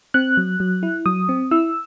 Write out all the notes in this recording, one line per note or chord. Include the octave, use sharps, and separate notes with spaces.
C4 F#6
F#3
F#3
E4
F#3 D#6
C4
E4 E6